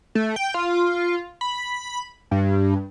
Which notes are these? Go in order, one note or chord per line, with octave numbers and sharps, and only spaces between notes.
A3
G5
F4
B5
G2